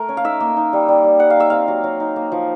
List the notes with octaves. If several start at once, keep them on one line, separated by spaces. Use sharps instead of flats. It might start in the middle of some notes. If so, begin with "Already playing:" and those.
Already playing: A3 A#4
C#4
F5
D#4 E5
A#3
D#4
G3
G3
G3
G3 F#5
F5
D#4 E5
C4 F5
F#3
F#3
D#4
A#3
F3